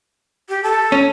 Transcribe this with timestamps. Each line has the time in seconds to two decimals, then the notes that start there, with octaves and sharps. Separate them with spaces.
0.49 G4
0.63 A4
0.92 C#4